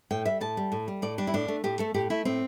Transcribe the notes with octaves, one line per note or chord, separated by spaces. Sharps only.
A2 G5
G3 E5
A2 A5
G3
A2
G3
A2 D5
G3 D4
E4
A2 D4
A3
A2 G4
A3 A4
A2 G4
A3 E4
A2 C4